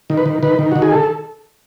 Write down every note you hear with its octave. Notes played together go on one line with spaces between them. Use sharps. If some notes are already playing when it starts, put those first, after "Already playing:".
D#3
B4
D#3
D#3 B4
D#3
D#3 F#4
G#4
A4